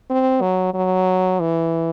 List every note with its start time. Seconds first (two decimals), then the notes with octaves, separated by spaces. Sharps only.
0.10 C4
0.41 F#3
0.74 F#3
1.40 E3